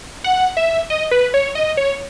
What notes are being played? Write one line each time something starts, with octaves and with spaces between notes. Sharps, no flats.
F#5
E5
D#5
B4
C#5
D#5
C#5